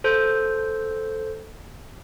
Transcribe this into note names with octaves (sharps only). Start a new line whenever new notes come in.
A4 C5 G6